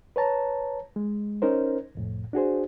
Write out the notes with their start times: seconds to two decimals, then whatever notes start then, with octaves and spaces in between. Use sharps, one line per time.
0.16 B4 C#5 A5 A#5
0.96 G#3
1.42 C#4 D#4 A#4 C5
1.95 C2 F2 A2
2.33 D4 F#4 G#4 C5